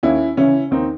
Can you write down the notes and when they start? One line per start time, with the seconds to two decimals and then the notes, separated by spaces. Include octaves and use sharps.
0.03 D#2 C#4 E4
0.37 C#3 E3 C#4 E4
0.71 D#2 C4 D#4